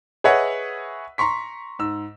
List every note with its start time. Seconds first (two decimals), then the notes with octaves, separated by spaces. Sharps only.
0.24 G#4 B4 C#5 D#5 E5 F#5
1.18 A#5 C6 C#6 B6
1.79 G#2 E6